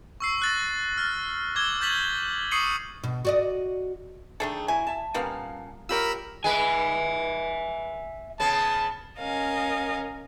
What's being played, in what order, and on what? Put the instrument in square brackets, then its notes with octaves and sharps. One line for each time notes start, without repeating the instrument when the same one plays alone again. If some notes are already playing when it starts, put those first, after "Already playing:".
[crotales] C#6 E6 C7
F#6 A6 A#6
F6 A6
D6 E6 G#6 G7
C#6 G6 A6 B6 F#7
C#6 D#6 C7 C#7 D#7 F#7
[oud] B2
F#4 D5 D#5
[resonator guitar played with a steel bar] D#3 G#4 G5 [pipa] A3 D4 A4
[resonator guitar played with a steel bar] F#3 E4 [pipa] G#5
[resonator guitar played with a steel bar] E5 A5
[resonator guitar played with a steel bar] A#2 C#4 F5 [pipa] G3 A#3 B3
[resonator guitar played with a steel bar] F4 G4 C#5 [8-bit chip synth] A#4 B5 E6
[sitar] G#3 B4 [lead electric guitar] E5 G#5
[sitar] C#3 B3 [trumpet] A5
[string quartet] C#4 A#4 D#5 F5 G#5